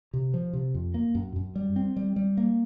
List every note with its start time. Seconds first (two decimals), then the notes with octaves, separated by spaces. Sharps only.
0.13 C3
0.34 F3
0.53 C3
0.74 F2
0.94 A#3
1.15 F#2
1.36 F#2
1.56 G3
1.76 C4
1.96 G3
2.16 G3
2.37 A#3